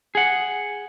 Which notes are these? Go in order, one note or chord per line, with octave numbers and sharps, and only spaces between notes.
G#4 F#5